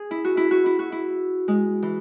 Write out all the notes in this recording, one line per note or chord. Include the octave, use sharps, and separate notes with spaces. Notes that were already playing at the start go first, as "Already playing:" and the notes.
Already playing: G#4
E4
F#4
E4
F#4
E4
F#4
E4
G#3
E3